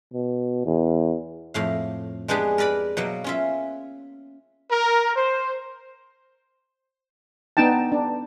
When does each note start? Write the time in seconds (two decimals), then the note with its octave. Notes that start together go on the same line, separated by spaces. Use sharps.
0.13 B2
0.65 E2
1.54 F2 A2 F5
2.28 G#3 B3 D4 G4 G#4
2.58 A#4 B4 D5 B5
2.97 B2 F#3 A#3
3.24 C#4 F4 E5
4.71 A#4
5.16 C5
7.57 B3 D4 D#4 G5 A5
7.92 D4